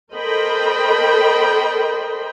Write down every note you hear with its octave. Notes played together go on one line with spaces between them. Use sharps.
A4 A#4 C5 D#5 G5 B5